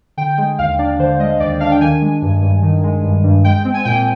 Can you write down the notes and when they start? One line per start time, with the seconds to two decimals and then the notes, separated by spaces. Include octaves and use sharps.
0.17 D3 G5
0.38 G#3 G5
0.59 D#2 F5
0.79 D4 D5
0.99 D3 C5
1.19 G#3 D#5
1.40 D#2 D5
1.60 D4 F5
1.71 G5
1.81 D#3 G#5
2.02 G#3
2.22 G2
2.42 G2
2.63 D#3
2.84 G#3
3.04 G2
3.24 G2
3.44 G#3 G5
3.65 C4
3.74 G#5
3.85 A#2 G5